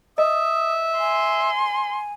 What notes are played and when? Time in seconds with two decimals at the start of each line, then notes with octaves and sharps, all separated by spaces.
0.18 D#5 E5 D#6
0.99 G#5 C6